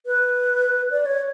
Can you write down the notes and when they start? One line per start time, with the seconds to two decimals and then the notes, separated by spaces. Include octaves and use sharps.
0.06 B4
0.91 D5
1.06 C#5